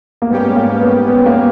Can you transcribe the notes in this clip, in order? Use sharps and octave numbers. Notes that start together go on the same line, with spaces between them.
A#3
G#2 G3 B3 C#4 G4
A#3
B3
B3
A#3